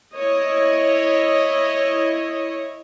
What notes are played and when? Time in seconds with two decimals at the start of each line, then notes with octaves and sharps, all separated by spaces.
0.15 E4 C#5 D#5